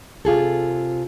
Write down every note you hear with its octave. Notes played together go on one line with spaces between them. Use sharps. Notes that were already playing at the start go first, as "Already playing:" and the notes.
C3 F4 G#4 A4